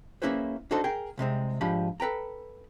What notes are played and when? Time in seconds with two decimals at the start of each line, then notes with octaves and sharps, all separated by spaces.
0.22 A#3 C#4 E4 G#4 B4 C5
0.71 D4 D#4 F#4 A4 C5 D#5
0.84 G#4 A#4 G5
1.18 C2 C3 G#3 C4
1.61 G#2 F3 D4 G4 B5
2.00 A4 B4 G5 A#5